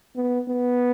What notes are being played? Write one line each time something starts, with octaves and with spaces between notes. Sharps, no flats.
B3
B3